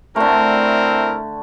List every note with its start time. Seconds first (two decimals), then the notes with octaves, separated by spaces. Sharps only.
0.16 D3 A3 C4 E4 A#4